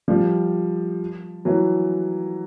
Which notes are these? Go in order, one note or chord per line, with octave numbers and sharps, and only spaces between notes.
F3 G3
E3 F#3